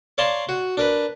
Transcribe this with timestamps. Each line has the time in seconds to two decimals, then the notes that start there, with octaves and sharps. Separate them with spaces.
0.18 C#5 D5 F5 A5 A#5 C6
0.49 F#4
0.77 D4 A#4 B4